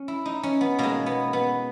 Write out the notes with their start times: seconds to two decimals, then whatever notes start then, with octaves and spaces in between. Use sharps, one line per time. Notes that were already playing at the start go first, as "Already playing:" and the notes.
Already playing: C#4
0.08 E4
0.26 D#4
0.43 C#4
0.61 B3
0.79 B2 G#3 A#3
1.06 B3
1.33 B3